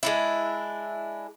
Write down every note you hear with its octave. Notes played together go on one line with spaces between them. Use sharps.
G#3 D4 E4